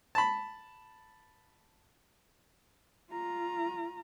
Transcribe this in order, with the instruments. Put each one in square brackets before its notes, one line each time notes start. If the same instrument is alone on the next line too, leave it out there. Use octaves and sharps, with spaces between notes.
[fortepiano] A5 B5
[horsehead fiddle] F4 A#5